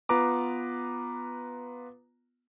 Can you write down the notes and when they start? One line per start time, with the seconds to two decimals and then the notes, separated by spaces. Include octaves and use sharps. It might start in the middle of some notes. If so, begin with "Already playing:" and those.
0.09 B3 F4 B4 A#5 D6